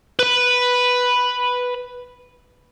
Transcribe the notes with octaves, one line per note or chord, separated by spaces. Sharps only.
B4 B5